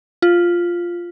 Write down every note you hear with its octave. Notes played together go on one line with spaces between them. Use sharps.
F4